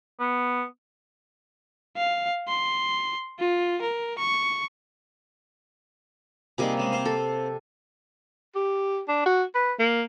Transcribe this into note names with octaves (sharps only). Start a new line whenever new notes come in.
B3
F5
C6
F4
A#4
C#6
C3 G3 A#3 D#4 G#4
C#3 G#3
C4 C5 F5
A4
G4
D4
F#4
B4
A#3